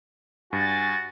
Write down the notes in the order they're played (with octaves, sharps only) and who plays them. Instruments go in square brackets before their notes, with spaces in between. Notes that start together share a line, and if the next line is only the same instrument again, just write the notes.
[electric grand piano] G2 [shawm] F#4 [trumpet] G#5 [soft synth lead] A6